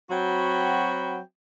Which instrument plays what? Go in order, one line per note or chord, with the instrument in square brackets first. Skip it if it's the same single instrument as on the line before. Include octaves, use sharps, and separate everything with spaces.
[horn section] F#3 C4 F#4 G5 B5